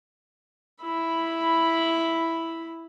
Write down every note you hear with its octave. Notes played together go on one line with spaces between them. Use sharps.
E4 B5